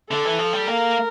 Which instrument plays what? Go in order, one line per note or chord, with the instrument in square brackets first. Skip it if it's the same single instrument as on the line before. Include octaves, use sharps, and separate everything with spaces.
[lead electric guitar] D3 [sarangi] A4
[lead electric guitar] E3
F3
G3
[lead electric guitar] A#3 [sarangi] A#4